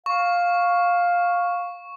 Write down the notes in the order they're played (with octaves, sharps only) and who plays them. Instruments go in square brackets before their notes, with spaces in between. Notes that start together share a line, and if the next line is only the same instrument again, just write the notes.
[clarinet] F5 [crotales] C#6